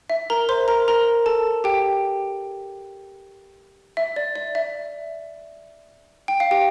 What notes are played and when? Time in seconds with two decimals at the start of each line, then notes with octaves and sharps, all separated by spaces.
0.10 E5
0.30 A#4 A#5
0.49 C5 C6
0.68 A#4 A#5
0.88 A#4 A#5
1.26 A4 A5
1.64 G4 G5
3.97 E5
4.16 D5
4.36 D5
4.55 E5
6.28 G5
6.40 F5
6.51 G4 G5